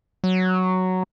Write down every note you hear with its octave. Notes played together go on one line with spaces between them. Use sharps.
F#3